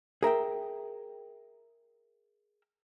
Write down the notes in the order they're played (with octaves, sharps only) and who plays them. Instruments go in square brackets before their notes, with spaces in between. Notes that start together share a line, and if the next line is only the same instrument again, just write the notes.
[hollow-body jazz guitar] G#4 A#4 E5 G5